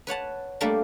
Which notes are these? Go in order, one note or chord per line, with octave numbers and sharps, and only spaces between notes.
B4 C#5 F#5 A5
G3 A3 A#3 D4 A#4